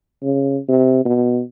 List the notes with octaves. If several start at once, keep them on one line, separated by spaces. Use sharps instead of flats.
C#3
C3
B2